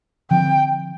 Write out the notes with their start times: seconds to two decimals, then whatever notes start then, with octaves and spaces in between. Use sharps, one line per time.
0.31 D3 F3 C4 G5